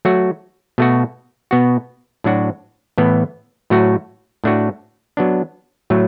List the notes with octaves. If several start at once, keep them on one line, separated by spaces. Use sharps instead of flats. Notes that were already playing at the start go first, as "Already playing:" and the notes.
F#3 A3 F#4
B2 A3 F#4
B2 B3 F#4
A2 F#3 D4 F#4
A2 E3 B3
A2 F#3 A3 F#4
A2 A3 D4 F#4
F#3 B3 D4
A2 F#3 A3